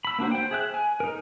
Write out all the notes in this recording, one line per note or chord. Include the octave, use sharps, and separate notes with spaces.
B5 E6
A#3 D4 F#4 C5
C5 G5
G#4 E5 F#6
G#5
D#4 A#4